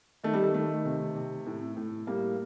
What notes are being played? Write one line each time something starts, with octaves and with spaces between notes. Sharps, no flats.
D#3 A3
G3
A3
D#3 A3
C3
C3
A2
A2
A2 G3 A#3